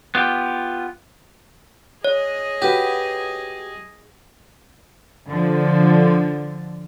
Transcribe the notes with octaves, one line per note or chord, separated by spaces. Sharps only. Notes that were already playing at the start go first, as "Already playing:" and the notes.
B3 F4 G4
G#4 C#5 D#5
F#4 G4 B4
D3 F3